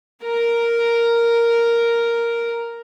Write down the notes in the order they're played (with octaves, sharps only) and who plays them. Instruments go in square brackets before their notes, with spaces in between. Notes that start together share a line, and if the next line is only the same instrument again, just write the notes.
[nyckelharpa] A#4 A#5